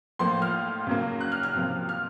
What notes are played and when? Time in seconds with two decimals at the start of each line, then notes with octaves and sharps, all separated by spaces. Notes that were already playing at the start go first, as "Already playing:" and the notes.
0.19 A2 F3 A#3 C6
0.42 F6
0.87 C#3 F#3 A#3
1.21 F#6
1.32 F6
1.43 F6
1.55 C3 F3 A#3
1.89 F6